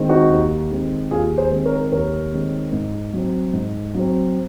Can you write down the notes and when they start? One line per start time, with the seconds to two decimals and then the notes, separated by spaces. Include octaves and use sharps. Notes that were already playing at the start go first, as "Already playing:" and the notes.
Already playing: D#3 G#3 C4
0.09 D#4 F#4
0.30 D#2
0.71 D#3 G#3 C4
1.11 D#2 F4 G#4
1.38 G#4 C5
1.51 D#3 G#3 C4
1.65 A#4 C#5
1.92 D#2 A#4 C#5
2.32 D#3 G#3 C4
2.72 G#2
3.14 F#3 C4
3.53 G#2
3.95 F#3 C4